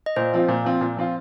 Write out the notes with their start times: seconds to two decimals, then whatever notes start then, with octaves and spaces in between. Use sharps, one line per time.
0.06 D#5
0.16 A#2 C5
0.34 F3 C4 F4
0.48 A#2
0.65 F3 C4 F4
0.81 A#2
0.97 F3 C4 F4